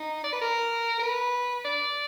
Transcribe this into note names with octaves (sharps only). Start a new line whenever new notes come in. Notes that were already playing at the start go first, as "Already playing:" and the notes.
Already playing: D#4
D5
B4
A#4
A#4
B4
D5